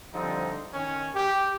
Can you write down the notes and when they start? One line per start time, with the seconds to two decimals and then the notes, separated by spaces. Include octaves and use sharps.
0.14 D3 F3 G3 C4 D#4
0.73 D#3 C#4
1.15 G4